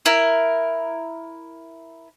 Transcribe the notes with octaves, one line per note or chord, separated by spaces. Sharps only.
E4 A#4